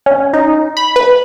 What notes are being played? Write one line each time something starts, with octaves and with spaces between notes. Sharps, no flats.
C#4
D#4
B5
B4